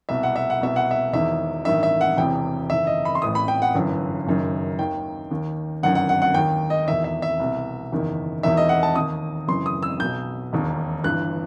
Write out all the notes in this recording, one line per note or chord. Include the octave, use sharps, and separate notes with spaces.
C2 B2 E5
F#5
E5
F#5
C2 B2 E5
F#5
E5
E1 E2 D#3 E5
A1 G2 D#3 E5
E5
F#5
E1 E2 C3 E3 G5
F#1 E2 D#3 E5
D#5
B5
C6
A1 A2 E3 D#6
B5
G5
F#5
G1 F#2 E3
F#1 F#2 D#3
D#2 D#3 G5
D#2 D#3
G1 F#2 D#3 F#5
F#5
F#5
F#5
D#2 D#3 G5
D#5
E1 E2 D#3 E5
E5
E5
C2 B2
F#1 E2 D#3
E1 E2 D#3 E5
D#5
F#5
A5
D#2 D#3 D#6
F#1 F#2 E3 C6
D#6
E6
B1 B2 G6
E1 D#2 D#3
G1 G2 E3 F#6